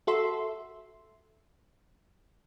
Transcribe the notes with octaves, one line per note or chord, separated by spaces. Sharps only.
F#4 A4 E5 C6